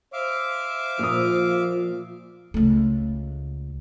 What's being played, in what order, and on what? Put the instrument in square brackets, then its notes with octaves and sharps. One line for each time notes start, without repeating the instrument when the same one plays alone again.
[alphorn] C5 [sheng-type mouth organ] E5 F5 D6
[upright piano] A#2 D#6 [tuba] F3
[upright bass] C#2 A3